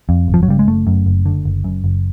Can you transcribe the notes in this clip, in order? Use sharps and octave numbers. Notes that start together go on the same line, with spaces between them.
F2
G1
F3
F#3
C#3 G3
G#3
F#1 A3
F#2
F#1
D3
F#1
F#2
F#1